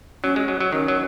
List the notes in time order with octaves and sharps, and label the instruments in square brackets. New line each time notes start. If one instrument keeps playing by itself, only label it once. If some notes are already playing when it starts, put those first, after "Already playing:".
[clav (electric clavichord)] F#3 [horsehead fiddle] C#4
[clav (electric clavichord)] G#3
F#3
F#3
[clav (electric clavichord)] D#3 [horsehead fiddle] C#4
[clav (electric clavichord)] F#3